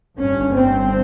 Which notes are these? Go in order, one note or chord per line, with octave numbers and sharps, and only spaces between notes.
G1 G2 C#4
C4